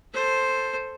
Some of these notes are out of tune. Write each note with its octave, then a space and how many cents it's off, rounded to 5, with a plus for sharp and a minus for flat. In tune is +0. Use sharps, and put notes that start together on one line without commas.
A4 +0 C5 +0